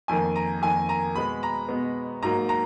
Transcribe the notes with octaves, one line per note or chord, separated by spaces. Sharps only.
F2 D#3 A#3 G#5
A#5
F2 D#3 A#3 G#5
A#5
B2 G#3 B3 B5
A#5
B2 G#3 B3
G#2 F#3 A#3 A#5
A#5